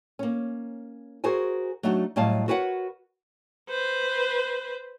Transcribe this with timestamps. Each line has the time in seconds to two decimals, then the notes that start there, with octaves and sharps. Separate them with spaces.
0.19 A#3 C#4
1.24 F#4 G#4 A#4 C5 G#5
1.83 F#3 A3 D4 D#4 F#4
2.16 A2 F#3 G3 D#5 F5 A5
2.48 F#4 A#4 B4 C#5 F5 F#5
3.69 B4 C5